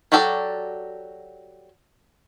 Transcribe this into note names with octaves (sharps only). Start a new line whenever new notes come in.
F#3 F#4 G4 A4 D5